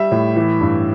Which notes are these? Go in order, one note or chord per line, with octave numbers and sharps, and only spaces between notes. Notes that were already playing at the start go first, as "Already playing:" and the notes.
Already playing: G3 E5
A2
E3
G2